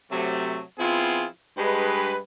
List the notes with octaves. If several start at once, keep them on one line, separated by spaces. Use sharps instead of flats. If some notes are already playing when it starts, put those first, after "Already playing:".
C3 F#3 A3
F3 B3 C4 E4 F4 G#4
G2 G#3 B4